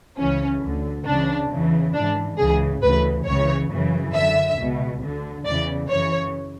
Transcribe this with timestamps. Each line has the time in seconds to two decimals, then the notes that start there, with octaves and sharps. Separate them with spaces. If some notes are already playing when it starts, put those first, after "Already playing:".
0.18 C#2 C#3 E3 C#4
0.61 D2 D3
1.06 C#2 C#3 E3 D4
1.50 E2 C#3 E3
1.93 G#2 E3 D4
2.37 C#2 C#3 E3 G#4
2.81 D2 C#3 E3 B4
3.25 C#2 C#3 E3 C#5
3.69 F#2 C#3 E3
4.13 F#2 D3 E5
4.57 C#2 B2
5.02 D2 D3
5.45 E2 C#3 E3 D5
5.89 F#2 C#3 E3 C#5